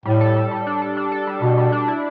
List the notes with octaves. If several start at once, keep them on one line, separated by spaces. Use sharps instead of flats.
A2 G3
A4
G3
G3
D4
A4
D4
A4
G3
B2 G3
G3
D4
E4